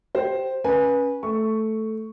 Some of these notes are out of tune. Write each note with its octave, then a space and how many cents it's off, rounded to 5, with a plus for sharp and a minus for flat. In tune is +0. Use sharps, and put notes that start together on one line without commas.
G4 -15 C5 +5
C#4 +0 B4 -20 G#5 +0
A3 -5 C#6 +0